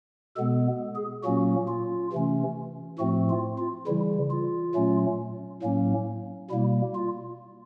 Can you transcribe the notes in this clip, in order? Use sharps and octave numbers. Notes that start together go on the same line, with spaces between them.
B2 G#3 B3 A4
G#4
A#2 F#3 A#3 C#4 F#4
F4
C3 E3 A3 C#4
A2 F3 A3 C4 F#4
F4
F4
C#3 E3 G3 E4
F4
A#2 F#3 A3 C#4
A2 F#3 A#3 C#4
B2 G3 A#3 E4
F4